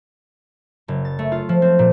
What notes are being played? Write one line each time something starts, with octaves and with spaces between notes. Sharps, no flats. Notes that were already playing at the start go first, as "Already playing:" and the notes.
F#1
A6
A3
F4
F3
C4
A#2